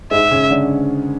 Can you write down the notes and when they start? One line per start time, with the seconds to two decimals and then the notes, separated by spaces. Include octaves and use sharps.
0.11 G#2 G#3 E5
0.31 C#3 C#4
0.51 D3 D4